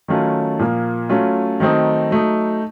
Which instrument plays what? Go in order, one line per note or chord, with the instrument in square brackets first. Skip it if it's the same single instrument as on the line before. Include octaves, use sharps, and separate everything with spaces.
[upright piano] D#3 F#3 A3 C#4 F4
A#2 F3 A#3
F#3 A3 C#4 F4
D#3 F#3 A3 C4 D#4
F#3 A3 D#4